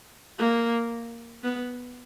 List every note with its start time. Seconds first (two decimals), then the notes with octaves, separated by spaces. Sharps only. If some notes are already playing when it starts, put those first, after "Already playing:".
0.39 A#3
1.43 B3